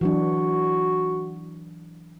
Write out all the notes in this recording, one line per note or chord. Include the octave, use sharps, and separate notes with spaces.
E3 F#3 D4 F#4